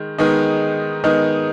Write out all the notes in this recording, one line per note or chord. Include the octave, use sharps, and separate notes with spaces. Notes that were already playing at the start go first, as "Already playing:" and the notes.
Already playing: D#3 G#3
D#3 G#3 B3 D#4
D#3 G#3 B3 D#4